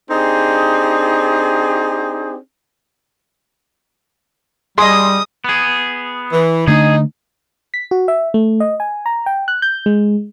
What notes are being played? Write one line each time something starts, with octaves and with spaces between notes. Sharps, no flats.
C4 D4 D#4 G4 G#4
G3 G#4 D#5 C6 D#6
B3 G#4
E3
D3 A3 D4 D#4 G#4
B6
F#4
E5
A3
D#5
G#5
A#5
G5
F#6
G6
G#3